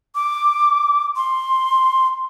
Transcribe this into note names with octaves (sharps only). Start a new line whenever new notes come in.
D6
C6